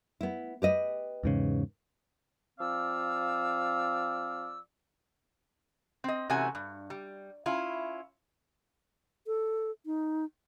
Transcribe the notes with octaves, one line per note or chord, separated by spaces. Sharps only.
B3 E4
G4 B4 D#5
E2 G#2 C#3
F3 C4 D5 F5 E6
C4 D#5
C3 E3 A3 C#4 F#4 G#5
G2
G3
C#4 E4 F4
A4
D#4